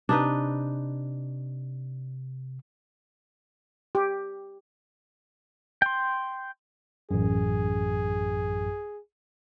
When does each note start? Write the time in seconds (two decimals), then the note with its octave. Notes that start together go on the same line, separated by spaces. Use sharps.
0.09 C3 D4 D#4 B4
3.95 G4
5.82 G5 C6
7.11 A1 F#2 G#4